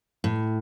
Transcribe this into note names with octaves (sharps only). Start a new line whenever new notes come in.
A2